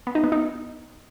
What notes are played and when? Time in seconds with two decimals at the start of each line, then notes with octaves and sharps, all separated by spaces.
0.07 B3
0.15 D#4
0.24 B3
0.32 D#4